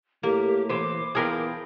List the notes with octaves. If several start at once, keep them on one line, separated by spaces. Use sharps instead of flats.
A2 A#3 G4
E3 C5 D6
E2 F3 G#4 A#4 B4 G5